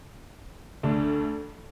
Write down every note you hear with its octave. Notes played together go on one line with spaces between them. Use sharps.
D2 D3 A3 D4